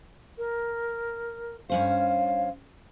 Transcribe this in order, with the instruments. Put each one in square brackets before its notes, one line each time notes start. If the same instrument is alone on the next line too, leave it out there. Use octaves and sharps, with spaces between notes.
[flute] A#4
[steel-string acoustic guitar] G2 C#4 C5 [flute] F5